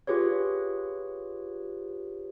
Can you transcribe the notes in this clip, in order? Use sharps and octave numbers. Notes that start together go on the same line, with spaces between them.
F4 G4 G#4 B4 C#5